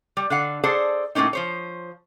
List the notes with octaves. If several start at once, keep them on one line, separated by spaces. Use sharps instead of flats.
G3
D3 F5 F#5
G#4 A4 C5 D5 F#5 A5
A2 A3 A#3 C#4 D#4
F3 C5 C#5